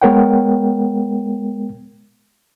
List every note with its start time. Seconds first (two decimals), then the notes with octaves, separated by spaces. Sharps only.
0.02 G#3 B3 A#4 C#5 F#5 G5